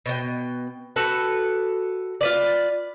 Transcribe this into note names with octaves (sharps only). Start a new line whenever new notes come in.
B2 G5
F#4 A4 B4 G5
F4 B4 D5